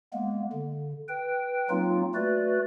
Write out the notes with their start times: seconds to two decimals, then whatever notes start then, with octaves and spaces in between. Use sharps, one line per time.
0.13 G#3 A#3 B3
0.52 D3
1.09 B4 G5
1.70 F#3 A#3 C4 D#4 F4
2.15 A3 F#4 B4 D5